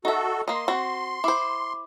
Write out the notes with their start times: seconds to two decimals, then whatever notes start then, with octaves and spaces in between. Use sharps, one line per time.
0.05 D#4 F#4 A4 E5
0.48 A#3 D#5 C6
0.68 C4 F#4
1.24 E4 C5 D6